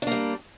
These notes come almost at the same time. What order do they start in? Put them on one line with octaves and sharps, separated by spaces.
D4 A#3 G3